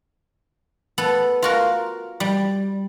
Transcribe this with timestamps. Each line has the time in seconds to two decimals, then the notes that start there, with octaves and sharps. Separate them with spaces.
0.98 B3 A4
1.42 F4 F#4 A#4
2.20 G3